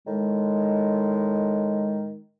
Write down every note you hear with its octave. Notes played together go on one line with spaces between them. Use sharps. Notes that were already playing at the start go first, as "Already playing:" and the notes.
A2 D#3 G#3